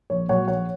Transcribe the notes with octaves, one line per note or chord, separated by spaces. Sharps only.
A#1 C#5
A#2 F#3 C#5 F#5
A#1 C#5 F#5